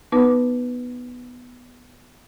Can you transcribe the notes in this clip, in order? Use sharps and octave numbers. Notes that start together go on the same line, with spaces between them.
B3 D#4 B4 D6